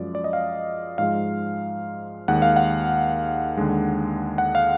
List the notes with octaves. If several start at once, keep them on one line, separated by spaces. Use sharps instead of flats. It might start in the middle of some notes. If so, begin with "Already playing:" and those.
Already playing: F#2 F3 G#3 D5
D5
D#5
F5
G#2 F3 G#3 F5
D#2 D#3 G#3 F#5
F5
F#5
D#2 D3 G#3
F#5
F5